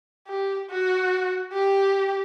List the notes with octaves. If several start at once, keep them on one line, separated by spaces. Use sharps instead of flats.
G4
F#4
G4